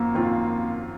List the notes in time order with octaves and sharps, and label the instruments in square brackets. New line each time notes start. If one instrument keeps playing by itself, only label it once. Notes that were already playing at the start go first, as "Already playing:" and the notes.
Already playing: [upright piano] G#1 F#2 F3 [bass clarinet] A#3
[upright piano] G#1 F#2 F3 C4 F4